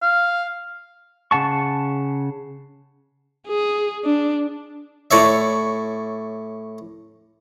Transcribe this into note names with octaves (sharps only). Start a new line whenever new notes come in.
F5
C#3 F#5 A5 C#6
G#4
D4
A2 C#5 D5 E5